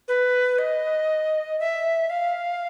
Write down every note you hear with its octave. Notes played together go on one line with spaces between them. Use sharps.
B4
D#5
E5
F5